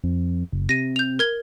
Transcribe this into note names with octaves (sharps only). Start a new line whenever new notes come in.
F2
F#1
C3 A#6 D#7
G6 F7
A#4 G#6 G7